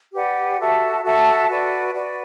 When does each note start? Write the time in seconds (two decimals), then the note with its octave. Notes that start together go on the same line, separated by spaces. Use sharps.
0.13 G4 B4 D5 F#5
0.59 F#4 A4 E5 A5
1.04 F#4 A4 E5 A5
1.48 F#4 B4 D5
1.94 F#4 B4 D5